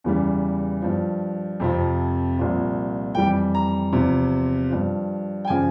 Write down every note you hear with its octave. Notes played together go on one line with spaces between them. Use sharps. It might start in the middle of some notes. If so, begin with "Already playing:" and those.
E2 C#3 E3 G3
G2 F3
F2 C3 F3
C2 A#2 F3
F2 E3 G3 G5
A#5
E2 C3 F3
G2 F3
G5
C#3 F3 G#5